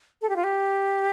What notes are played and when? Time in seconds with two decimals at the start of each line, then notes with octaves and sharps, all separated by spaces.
0.22 A4
0.29 G4
0.36 F4
0.44 G4